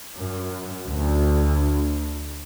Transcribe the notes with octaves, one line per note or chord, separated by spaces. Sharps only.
F#2
D2